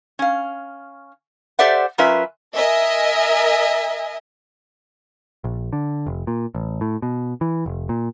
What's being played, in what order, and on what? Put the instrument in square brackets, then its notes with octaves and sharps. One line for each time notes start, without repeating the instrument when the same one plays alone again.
[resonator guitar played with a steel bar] C#4 F5
G4 A4 C5 D5 E5 F#5
F#3 C#4 F4 A#4 B4 E5
[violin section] A#4 D#5 E5 G#5
[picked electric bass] A#1
D3
F1
A#2
A1
A2
B2
E3
F1
A#2